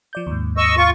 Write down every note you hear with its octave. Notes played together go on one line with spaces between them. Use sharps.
F3 D5 G6
D#2 G#2
D#5 C#6 E6
F4 C#6